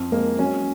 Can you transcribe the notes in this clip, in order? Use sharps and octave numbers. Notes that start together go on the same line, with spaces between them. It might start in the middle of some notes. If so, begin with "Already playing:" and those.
Already playing: F2
G#3 A#3
F#3 C#4